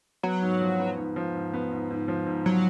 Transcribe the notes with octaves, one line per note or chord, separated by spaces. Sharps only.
F#3 B3
G#2
F3
B3
G#2
F3
G#2
B3
G#2
G#2
F3
G#2
F#3